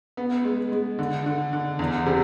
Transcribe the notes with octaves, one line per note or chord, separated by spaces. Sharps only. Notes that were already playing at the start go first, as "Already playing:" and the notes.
B3
G#3
G#3
D3
D3
D3
E2
C3